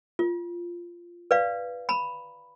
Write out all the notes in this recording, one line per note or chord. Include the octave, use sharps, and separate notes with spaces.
F4
B4 D5 F5
A#5 B5